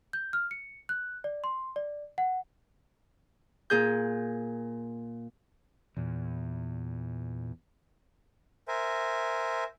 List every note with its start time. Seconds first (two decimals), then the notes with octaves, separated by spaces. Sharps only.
0.13 G6
0.33 F6
0.51 C#7
0.89 F#6
1.24 D5
1.44 C6
1.76 D5
2.18 F#5
3.70 A#2 G#4 G6
5.97 E2 A#2
8.68 A#4 C5 E5 G#5